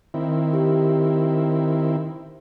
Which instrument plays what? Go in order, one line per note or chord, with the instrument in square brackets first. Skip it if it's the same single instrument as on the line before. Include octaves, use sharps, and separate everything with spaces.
[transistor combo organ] D#3 C4 E4
[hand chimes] G4